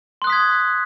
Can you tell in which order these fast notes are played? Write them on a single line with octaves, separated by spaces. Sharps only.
C6 F#6 D#6 B6 G#6